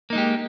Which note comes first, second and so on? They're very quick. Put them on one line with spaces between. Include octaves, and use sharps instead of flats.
A#3 D#4 G#3 G4